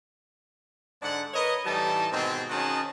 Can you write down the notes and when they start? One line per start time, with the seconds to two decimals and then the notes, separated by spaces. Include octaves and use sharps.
1.02 G#2 D3 D4 F#5
1.34 A#4 B4 C#5 D#5
1.66 A2 E3 G3 D#4 A5
2.12 G#2 B2 D#3 G#3 C4
2.50 D#3 C#4 F#4 G#4 D#5 A5